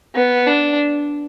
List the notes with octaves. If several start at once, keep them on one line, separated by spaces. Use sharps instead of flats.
B3
D4